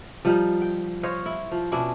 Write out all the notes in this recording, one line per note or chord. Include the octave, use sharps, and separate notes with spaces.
F3 G3 D#4
G5
C5 C#5 D#5 F5
E4
F3
B2 C#4 D4 E4